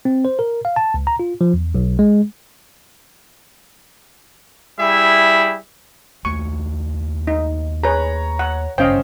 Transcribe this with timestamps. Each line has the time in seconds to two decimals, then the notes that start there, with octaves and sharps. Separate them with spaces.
0.05 C4
0.25 C5
0.39 A#4
0.65 F5
0.76 A5
0.94 C#2
1.07 A#5
1.19 F4
1.41 F3
1.54 E2
1.75 B1
1.99 G#3
4.78 G3 E4 G#4 E5
6.25 D#2 A3 C#6
7.27 D#4
7.83 G#4 B4 C#5 A#5
8.39 F#5
8.78 G#1 G2 C#3 C#4 C5 D#5 F5 G5